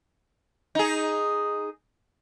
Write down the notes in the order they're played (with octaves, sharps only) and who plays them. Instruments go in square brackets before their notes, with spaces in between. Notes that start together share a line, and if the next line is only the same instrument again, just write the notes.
[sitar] D#4 G#4